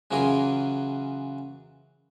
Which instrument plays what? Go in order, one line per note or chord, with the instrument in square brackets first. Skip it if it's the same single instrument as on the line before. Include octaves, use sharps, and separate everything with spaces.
[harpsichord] C#3 E3 F#3 F4 G#4 A#4